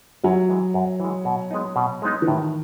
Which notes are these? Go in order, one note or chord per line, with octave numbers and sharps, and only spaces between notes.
F#2 F#3
E3 G#3
F#2
E3 G#3
B2
G#3 B3 D#4
B2
G#3 B3 D#4
E3
A2 D#3